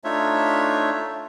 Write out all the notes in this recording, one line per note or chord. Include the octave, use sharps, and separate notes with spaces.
A3 D4 D#4 F4 C#5 E5